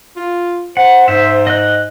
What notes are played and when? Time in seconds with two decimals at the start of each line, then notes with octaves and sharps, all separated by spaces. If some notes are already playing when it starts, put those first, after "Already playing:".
0.16 F4
0.77 C5 F#5
1.08 G#2 C5 E5
1.47 D#5 F#6